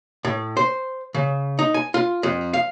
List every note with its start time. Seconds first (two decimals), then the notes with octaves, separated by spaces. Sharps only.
0.25 A2
0.57 C5
1.14 C#3
1.59 D#4
1.74 G#5
1.94 F4
2.23 F2
2.53 F5